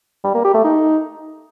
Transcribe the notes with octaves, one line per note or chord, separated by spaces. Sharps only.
G3
A#3
G4
A3
D#4